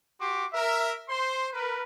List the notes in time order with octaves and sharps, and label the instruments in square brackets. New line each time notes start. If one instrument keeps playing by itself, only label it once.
[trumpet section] F#4 G4 C6 D6
A#4 E5
C5 C6
A#4 B4